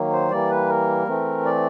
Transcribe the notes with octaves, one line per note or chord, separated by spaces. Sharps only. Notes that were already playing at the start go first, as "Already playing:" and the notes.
Already playing: D#3 F#3 A#3
C5
E3 G3 A#3 D5
B4
A#4
E3 A3 C4
D5